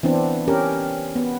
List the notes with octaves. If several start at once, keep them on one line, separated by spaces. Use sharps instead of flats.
E3 B3 C4 D4
C#4 G4 A#4
B3